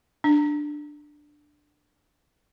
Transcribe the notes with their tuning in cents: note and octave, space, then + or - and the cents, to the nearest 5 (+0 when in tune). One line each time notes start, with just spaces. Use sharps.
D4 +10